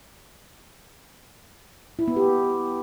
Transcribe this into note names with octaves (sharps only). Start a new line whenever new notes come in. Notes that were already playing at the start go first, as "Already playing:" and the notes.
E4
B3
G4